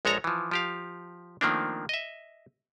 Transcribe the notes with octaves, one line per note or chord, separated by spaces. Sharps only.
A#1 G#3 A4 C#5 A#5
E3 F3
F3 G4 F5
D#3 F3 A3 A#3 C4 D4
D#5 E5